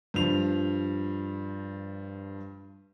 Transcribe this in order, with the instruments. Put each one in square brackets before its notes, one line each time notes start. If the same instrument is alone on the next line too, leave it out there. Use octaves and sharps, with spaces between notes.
[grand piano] G2 F3 F7